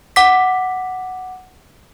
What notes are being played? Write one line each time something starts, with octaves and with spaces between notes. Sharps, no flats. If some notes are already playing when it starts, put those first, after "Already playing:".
F#5 D6 B6